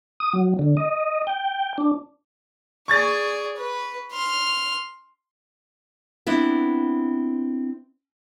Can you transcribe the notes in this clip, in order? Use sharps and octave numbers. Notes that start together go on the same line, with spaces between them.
D#6
F#3
D3
D#5
G5
D4
G#4 D5 C#6 G#6 A6
B4
C6 F6
B3 C4 D4 E4